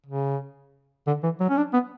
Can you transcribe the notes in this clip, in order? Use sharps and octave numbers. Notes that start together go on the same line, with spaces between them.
C#3
D3
E3
F#3
C#4
D4
B3